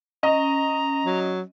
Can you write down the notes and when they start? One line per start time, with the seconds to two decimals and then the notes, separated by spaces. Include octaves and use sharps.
0.23 C#4 D#5 A#5
1.04 F#3